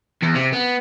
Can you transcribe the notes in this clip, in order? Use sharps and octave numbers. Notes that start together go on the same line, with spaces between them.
E2
C3
B3